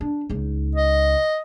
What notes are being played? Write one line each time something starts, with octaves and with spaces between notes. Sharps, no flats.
D4
C#2 D#4
D#5